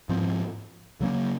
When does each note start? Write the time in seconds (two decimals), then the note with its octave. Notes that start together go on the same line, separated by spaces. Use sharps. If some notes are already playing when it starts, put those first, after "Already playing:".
0.09 G#2 F3 C4
1.00 C#3 F#3 A#3 C#4